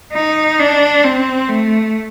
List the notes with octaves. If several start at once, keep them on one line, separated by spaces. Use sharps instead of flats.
D#4
D4
C4
A3